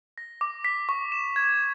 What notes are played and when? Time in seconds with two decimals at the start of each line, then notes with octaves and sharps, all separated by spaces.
0.18 A#6
0.41 D6
0.65 B6
0.89 C#6
1.12 E7
1.36 G#6